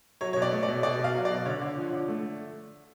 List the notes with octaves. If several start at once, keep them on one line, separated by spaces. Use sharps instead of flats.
F#3 C#5
B2 C#5
D5
A3
D5
B2
B2 D5
B2 F5
F#3
D5
B2
D3 C#5
D3
F3
D3
A3